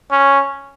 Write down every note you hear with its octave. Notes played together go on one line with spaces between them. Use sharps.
C#4